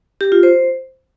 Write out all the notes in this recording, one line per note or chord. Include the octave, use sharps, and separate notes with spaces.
G4
F4
C5